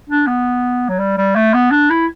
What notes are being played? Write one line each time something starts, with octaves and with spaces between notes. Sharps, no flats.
D4
B3
F#3
G3
G3
A3
B3
D4
E4